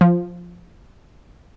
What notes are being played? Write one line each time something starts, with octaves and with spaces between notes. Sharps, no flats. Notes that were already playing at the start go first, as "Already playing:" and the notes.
F3